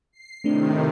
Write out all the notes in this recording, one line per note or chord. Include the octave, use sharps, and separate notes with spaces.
C7
A2 C3 D#3 A3 C4 D4